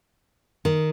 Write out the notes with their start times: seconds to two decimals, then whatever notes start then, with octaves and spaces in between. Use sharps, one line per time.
0.65 D#3